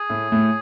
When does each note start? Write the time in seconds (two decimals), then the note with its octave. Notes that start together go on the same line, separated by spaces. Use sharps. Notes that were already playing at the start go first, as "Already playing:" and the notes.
Already playing: G#4
0.10 A2 A3
0.32 A2 A3